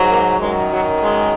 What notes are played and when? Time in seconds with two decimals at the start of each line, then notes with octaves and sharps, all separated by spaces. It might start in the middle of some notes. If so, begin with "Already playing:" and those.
Already playing: G#2 F#3
0.09 A#3
0.40 F#2 D#3 F#3 G#3
0.71 F#3
1.02 G#3